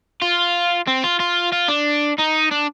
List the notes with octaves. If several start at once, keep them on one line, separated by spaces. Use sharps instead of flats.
F4
C4
F4
F4
F4
D4
D#4
D4